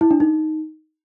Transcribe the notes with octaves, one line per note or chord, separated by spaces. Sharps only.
E4
D4
D#4